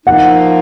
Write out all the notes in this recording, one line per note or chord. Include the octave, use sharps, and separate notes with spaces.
F3 A#3 D#4 F#5